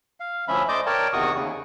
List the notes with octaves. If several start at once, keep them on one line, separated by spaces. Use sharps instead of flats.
F5
D2 F3 C#4 E5 B5
A3 C5 D5 D#5 D6 G6
A#4 C#5 D5 G5 A5
E2 C3 D#3 F#4 C#6 D#6
D#2 C#3